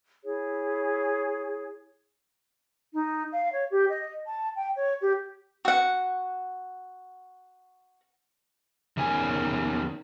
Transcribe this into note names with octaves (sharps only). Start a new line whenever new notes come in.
E4 G#4 C#5
D#4
F5
C#5
G4
D#5
A5
G5
C#5
G4
F#4 F#5
E2 D#3 C#4 G#5